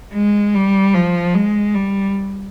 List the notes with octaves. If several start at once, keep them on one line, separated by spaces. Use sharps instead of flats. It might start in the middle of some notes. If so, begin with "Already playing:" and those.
G#3
G3
F3
G#3
G3